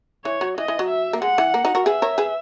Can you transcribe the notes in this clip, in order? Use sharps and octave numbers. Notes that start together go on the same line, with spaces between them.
E3 C#5
F#3
E3 D#5
E3
F#3
E5
A#3
G#3 F#5
E3
A#3
D#4 F#4
F#4 A#4
G#4 B4 E5
A#4 C#5
G#4 B4